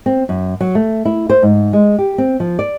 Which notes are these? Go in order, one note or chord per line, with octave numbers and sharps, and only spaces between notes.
C4
F#2
F#3
A3
E4
C5
G#2
G#3
G4
C4
F3
D5